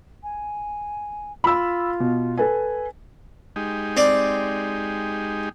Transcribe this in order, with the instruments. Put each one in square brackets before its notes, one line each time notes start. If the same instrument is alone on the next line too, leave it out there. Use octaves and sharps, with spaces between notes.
[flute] G#5
[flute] F4 [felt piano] B5 E6
[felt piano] B2
A4 B4 G#5
[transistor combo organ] G#3 D#4 G4
[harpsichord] C4 D5